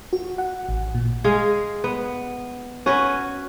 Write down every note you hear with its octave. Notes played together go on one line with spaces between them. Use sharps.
F#4
F#5
A1
A#2
G#3 G#4 F5
B3
C#4 F#4 B4 C#5